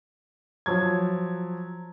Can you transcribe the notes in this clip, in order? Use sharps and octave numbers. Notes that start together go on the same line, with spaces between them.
F3 F#3 G#6